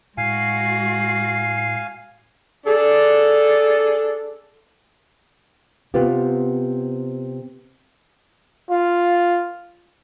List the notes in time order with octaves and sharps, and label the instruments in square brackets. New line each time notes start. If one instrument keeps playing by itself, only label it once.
[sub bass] A2 [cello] G#3 F#4 [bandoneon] F5 G#5 [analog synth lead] C7
[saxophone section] D4 G#4 A4
[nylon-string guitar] C3 B3 C4 F4 G4
[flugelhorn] F4